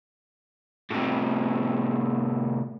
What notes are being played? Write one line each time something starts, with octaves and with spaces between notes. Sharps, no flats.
A2 C3